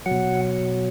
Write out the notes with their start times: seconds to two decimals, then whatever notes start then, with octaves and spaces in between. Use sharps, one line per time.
0.06 F#3 F#5
0.11 B2